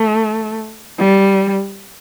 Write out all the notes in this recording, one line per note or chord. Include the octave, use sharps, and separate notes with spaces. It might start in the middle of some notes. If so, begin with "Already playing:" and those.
Already playing: A3
G3